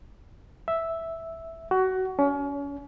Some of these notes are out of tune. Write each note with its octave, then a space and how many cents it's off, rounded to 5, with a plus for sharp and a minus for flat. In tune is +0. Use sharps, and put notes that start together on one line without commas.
E5 -5
F#4 +20
C#4 +35